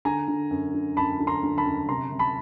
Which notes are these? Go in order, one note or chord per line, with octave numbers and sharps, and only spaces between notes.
D3 G#5 A#5
D3
F#2
D3
F#2 A5 B5
D3
A#5 C6
D3
A5 B5
F#2
C3 A#5 C6
C3
A5 B5